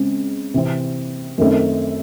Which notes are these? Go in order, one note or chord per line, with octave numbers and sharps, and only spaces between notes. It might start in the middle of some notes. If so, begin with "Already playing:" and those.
Already playing: C#3 G#3 C4
C3 E3 C4
F#2 D#3 A3 C4